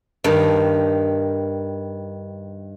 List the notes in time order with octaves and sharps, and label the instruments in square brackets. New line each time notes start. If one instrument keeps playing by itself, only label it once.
[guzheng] G2 D#3